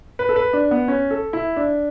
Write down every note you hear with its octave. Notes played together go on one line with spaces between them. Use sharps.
B4
A4
B4
D4
B3
C#4
A4
E4
D4